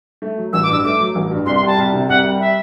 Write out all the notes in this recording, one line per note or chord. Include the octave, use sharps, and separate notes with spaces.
A3
F#3
A1 E6
D6
G2 E6
A3 D6
F#3
A1
G2
C2 C6
C6
G3 A5
C2
C3
C2 F#5
G3
E5